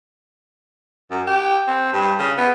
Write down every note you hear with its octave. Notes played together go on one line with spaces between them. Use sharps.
F#2
G4
C4
G2
C#3
B3